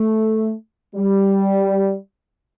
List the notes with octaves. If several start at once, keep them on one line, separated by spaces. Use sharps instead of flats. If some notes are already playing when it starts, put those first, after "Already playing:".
Already playing: A3
G3